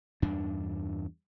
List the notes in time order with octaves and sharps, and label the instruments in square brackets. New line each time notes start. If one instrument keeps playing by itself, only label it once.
[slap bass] E2 G2 D4